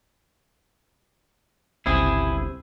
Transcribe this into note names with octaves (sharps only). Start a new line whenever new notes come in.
G1 C#2 C3 C4 E4 G#4 G5